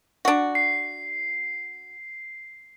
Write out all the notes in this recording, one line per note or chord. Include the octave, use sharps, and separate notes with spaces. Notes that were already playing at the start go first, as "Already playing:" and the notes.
D4 F#4
C7